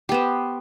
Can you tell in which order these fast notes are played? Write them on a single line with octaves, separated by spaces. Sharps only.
G4 B3 C5